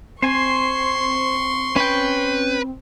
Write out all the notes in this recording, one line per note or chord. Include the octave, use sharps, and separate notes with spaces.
C4 C5 G#5 C6 C#6
C#4 B4 G5